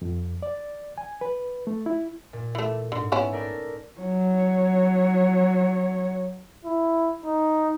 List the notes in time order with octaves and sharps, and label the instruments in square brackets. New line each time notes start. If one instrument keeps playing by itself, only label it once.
[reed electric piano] F2
D5
G#5
B4
A3
E4
[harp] A#2
[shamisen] E3 A3
[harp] G#2 [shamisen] D3
[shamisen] B3 C#4 E4
[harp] A3 A#4 D5
[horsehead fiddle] F#3 C#5
[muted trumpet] E4
D#4